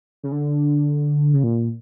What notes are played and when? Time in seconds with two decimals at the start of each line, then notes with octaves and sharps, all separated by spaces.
0.23 C#3
0.32 D3
1.33 C#3
1.43 A#2